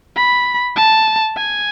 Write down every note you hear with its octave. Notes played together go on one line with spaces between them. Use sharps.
B5
A5
G#5